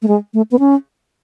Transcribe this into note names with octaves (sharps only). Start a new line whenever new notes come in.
A3
G#3
A3
B3
C#4